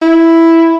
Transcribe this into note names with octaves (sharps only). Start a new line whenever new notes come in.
E4